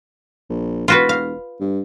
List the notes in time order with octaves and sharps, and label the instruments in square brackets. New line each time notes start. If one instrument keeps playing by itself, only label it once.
[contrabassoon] A#1
[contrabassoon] E1 [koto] F4 F#4 B4
[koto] F5
[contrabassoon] G2